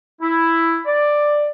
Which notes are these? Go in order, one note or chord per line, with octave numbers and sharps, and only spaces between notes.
E4
D5